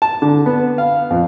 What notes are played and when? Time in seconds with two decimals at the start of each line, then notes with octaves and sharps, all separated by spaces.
0.02 A5
0.22 D3
0.46 B3
0.78 F5
1.10 F2